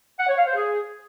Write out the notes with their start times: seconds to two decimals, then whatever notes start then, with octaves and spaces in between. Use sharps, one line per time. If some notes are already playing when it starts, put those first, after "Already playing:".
0.19 F#5
0.28 C#5
0.37 F5
0.46 C5
0.55 G#4